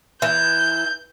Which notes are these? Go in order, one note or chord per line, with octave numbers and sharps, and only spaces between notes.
E3 G6